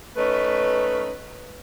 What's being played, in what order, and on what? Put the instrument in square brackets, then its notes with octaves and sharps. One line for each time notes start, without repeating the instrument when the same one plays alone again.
[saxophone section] A3 C#4 D#4 B4